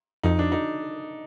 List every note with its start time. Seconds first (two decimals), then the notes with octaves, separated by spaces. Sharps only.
0.23 F2 D#4
0.39 D4
0.52 D#4